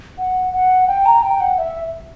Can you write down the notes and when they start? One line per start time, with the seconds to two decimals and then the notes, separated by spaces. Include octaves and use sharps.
0.18 F#5
0.53 F#5
0.88 G5
1.06 A#5
1.23 G5
1.40 F#5
1.58 E5